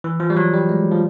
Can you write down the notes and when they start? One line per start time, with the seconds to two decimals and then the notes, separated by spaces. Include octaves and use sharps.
0.04 E3
0.20 F3
0.30 G3
0.37 F#3
0.53 G3
0.69 G#3
0.91 F3